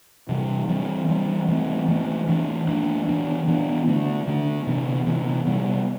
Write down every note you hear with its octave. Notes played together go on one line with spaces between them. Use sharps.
C3 E3 G3
E3 G3 C4
E3 G3 C4
E3 A3 C4
E3 A3 C4
E3 A3 D4
E3 A3 D4
E3 B3 D4
E3 B3 D4
D3 A3 D4
D3 A3 D4
C3 E3 B3
C3 E3 B3
C3 G3 B3